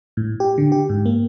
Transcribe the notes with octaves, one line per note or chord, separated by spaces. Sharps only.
A2
G4
D3
G4
G#2
A#3